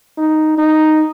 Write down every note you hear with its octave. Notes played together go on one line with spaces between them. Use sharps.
D#4
D#4